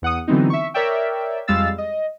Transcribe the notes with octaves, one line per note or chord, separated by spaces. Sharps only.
E2 F#5 D#6
D3 E3 F#3 B3 C4 D#4
E5 C#6
A#4 C#5 D5 E5 G5
F2 G3 G#3 F5 E6 A6
D#5